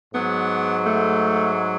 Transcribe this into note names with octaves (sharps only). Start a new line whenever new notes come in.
G#2 F#3 B3
A3